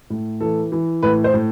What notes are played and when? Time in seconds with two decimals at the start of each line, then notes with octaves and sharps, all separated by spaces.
0.10 A2
0.41 E3 A4
0.72 E3
1.03 A2 B4
1.24 C5
1.34 A2